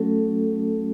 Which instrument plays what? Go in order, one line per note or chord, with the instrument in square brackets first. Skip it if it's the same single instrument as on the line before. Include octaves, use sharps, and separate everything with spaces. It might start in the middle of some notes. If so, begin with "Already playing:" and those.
Already playing: [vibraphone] F#3 A3 C#4 F#4 A4